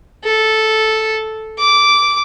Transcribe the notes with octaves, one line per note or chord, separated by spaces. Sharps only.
A4
D6